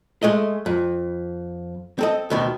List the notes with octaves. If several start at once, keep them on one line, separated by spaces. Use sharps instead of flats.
G#3 A3 D#5
F2
C4 A4 D#5
D2 B2 D#3